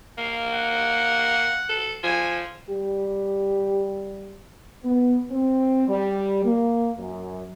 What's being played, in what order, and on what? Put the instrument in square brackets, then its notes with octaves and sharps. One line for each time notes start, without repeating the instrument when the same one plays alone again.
[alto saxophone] A#3 [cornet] F5
[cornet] F#5
[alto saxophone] A4
[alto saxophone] F3 [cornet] G#5
[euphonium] G3 [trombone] G4
[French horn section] B3
C4
G3
A#3
F#2